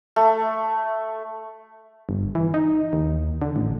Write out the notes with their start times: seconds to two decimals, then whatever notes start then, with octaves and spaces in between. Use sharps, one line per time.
0.16 A3
2.09 G1
2.35 E3
2.54 D#4
2.93 D#2
3.42 D3
3.56 A1